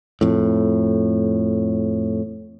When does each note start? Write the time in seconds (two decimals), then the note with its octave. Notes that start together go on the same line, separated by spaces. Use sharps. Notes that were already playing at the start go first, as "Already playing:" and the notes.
0.21 F2 A2